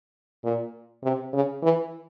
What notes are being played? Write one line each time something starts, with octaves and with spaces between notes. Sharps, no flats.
A#2
C3
C#3
E3